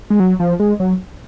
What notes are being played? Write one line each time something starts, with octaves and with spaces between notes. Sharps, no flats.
G#3
F#3
F3
G#3
F#3